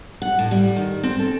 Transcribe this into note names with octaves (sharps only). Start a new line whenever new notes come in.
F#5
A2
G3
D#3
C4
A4